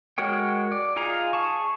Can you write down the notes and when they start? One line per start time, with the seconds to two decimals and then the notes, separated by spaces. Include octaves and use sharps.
0.18 G#3 F#4 A#4 C#5 G5
0.72 D5
0.96 D#4 F4 G#4 F5 A#5
1.33 G#4 A5 C#6